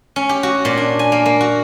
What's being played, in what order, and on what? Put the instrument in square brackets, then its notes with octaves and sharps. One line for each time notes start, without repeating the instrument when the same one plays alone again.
[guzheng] C#4
G4
F#4
A#2
D4
G#5
A#3
A#3
F#4